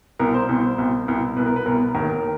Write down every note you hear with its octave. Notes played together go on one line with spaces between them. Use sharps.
C2 B2 A#4
C5
C2 B2
C2 B2
C2 B2
C2 B2 B4
A#4
B4
C2 B2 A#4
D#2 D#3 A#4
A#4